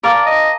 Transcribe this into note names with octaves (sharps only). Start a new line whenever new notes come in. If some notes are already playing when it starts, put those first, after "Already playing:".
A#4 D5 F5 A5 D6
D#5